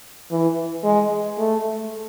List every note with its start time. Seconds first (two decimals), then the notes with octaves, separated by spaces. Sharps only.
0.31 E3
0.84 G#3
1.38 A3